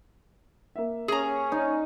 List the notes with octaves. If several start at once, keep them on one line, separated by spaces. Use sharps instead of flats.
A#3 E5
C#4 G#4 A#5
D#4